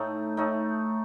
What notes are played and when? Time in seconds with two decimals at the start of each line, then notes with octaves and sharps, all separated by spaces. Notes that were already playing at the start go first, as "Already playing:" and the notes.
Already playing: A2 A3 D#4
0.37 A2 A3 D#4